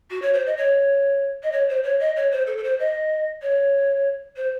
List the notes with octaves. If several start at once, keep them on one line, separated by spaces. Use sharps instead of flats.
F#4
C#5
C5
D#5
C#5
D#5
C#5
C5
C#5
D#5
C#5
C5
A4
A4
C5
D#5
C#5
C5